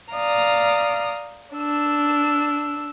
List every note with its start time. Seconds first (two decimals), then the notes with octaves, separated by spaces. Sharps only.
0.14 D5 F5 A#5 D#6
1.54 D4 E6